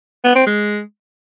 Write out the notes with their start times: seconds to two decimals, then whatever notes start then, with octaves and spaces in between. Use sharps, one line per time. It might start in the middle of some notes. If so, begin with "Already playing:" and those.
0.24 B3
0.35 C4
0.46 G#3